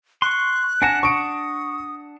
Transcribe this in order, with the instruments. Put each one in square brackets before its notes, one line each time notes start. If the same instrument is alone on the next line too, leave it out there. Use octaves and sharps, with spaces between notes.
[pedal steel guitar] C6 C#6 [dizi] F#6
[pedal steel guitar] D4 F#5 A5 [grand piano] G#5 A#6
[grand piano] C#6 D7 [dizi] D#6